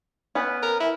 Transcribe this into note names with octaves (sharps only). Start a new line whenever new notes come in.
B3 C#4 B4
A#4
E4